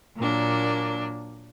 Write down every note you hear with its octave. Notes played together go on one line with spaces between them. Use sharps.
A#2 F#3 A#3 D4